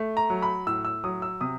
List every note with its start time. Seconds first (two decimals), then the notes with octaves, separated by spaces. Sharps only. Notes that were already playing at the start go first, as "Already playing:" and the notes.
Already playing: A3
0.17 A#5
0.30 F#3
0.42 B5
0.67 A2 E6
0.85 E6
1.04 F#3 D#6
1.22 E6
1.41 C3 D#6